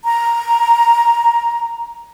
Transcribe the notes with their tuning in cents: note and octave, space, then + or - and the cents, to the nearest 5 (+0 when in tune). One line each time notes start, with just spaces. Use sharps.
A#5 +5